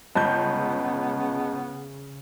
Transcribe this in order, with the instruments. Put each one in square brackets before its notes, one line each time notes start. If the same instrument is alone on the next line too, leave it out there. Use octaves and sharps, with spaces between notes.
[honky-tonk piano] G1 C#2 G6 [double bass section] C#3 [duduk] B3 [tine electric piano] D#5 A5 B5